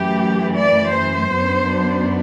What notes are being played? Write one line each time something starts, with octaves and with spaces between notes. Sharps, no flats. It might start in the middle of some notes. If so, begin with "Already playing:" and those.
Already playing: F#2 E3 A3 G4
D5
C5
F#2 F#3 B3 D4